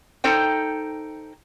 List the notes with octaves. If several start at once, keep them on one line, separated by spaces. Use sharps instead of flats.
D#4 A4 C5 G5